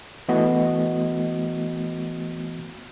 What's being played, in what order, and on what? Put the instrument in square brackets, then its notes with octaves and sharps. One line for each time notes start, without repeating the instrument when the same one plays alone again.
[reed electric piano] E3 A3 B3 F#4 D#5